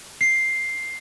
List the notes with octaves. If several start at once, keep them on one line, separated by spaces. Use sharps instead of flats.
C7